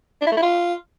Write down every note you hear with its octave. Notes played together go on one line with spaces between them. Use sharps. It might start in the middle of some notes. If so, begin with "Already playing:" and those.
D4
E4
A3
E4
F4